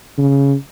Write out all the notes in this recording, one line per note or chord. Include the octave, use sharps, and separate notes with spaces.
C#3